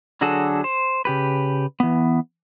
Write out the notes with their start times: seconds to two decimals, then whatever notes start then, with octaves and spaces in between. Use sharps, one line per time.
0.21 D3 F#3 D4 F#4 G#4 A4
0.64 C5
1.05 C#3 G4 B4
1.80 E3 B3